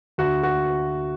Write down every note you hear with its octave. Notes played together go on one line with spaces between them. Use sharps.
D2 F#4
F#4